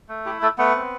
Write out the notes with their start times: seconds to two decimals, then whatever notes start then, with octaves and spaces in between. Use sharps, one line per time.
0.09 A3
0.26 E4 G4
0.42 A3 A4
0.58 A3 B3 B4
0.75 C4